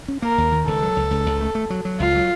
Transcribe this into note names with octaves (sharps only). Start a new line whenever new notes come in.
C#4
A#3 A#4
D#2
D#3
C#2 A4
F#3
C#2
C#2
C#2
A3
A3
F#3
F#3
C#2 F4
F#3